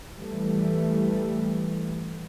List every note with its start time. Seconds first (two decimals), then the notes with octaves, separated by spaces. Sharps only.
0.18 E3 G3 A3